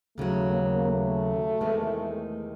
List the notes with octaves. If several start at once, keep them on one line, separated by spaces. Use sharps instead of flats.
D#2 C#3 F#3 A3
A#3
A3
E2 C3 D#3 G#3 B3